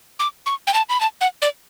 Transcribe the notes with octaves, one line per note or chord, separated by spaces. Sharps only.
D6
C#6
G5
A5
B5
A5
F#5
D5